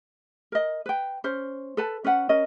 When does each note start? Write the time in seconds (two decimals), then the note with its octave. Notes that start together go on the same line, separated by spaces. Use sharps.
0.52 A#4 D#5
0.86 B4 G5
1.24 C#4 C5
1.77 A4 B4 A5
2.04 C#4 B4 F#5
2.29 C#4 A#4 D#5